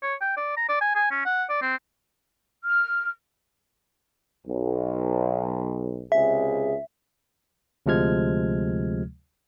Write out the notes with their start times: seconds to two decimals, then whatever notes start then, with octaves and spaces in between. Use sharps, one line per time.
0.03 C#5
0.21 G5
0.37 D5
0.57 A#5
0.69 D5
0.81 G#5
0.96 G#5
1.11 C#4
1.26 F#5
1.49 D5
1.62 C4
2.64 F6
4.47 B1
6.12 C#2 C3 G#4 E5
7.86 D2 C3 F3 G#3 F6 G#6